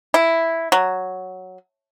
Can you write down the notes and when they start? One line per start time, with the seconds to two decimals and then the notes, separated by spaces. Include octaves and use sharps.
0.14 E4
0.72 F#3